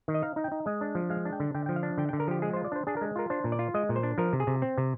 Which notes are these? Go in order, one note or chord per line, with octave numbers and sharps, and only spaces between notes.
D#3
D#5
D#4 F5
D#4
G5
D#4
G#3 D#5
D4
F3
G#3 F5
D4
G5
D3
D3 G5
F3 G5
F5
D4
D3 G5
G5
D3
A#4
F3 G4
G#3 G#4
C5
F4
D5
D4 C5
D4 G#4
A#4
G#3
F4 A#4
D4 C5
A#2
D5
F4
G#3 D#5
A#2
C5
D4
F3 A#4
C3
G#4
C3
C4
C3